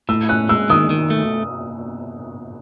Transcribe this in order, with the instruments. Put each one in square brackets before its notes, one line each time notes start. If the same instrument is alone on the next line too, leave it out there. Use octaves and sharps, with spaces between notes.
[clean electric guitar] A2 [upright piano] E6
[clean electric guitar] C#4 [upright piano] F#6
[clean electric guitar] G#3 [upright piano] E6
[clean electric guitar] D#3 [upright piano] D#6
[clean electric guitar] D#3
A3